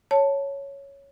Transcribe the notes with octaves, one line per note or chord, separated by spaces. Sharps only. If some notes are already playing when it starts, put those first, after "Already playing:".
C#5 A5